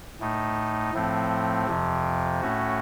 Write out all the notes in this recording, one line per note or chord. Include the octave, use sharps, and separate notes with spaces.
A2 A3 D#4
A2 F3 A3 C4
F2 C3 F3
A2 A3 C#4 F#4